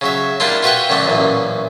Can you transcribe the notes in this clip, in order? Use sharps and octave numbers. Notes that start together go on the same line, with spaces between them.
C#3 F#3 E5
G3 A#3 D4 E4 F4
F4 F#4 B4 E5 G5 C#6
F#2 D3 A3 D4
A1 F#2 A#2